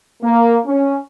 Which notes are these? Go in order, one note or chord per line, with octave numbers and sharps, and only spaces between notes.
A#3
C#4